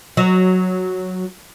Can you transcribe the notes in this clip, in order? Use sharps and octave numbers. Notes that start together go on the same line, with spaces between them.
F#3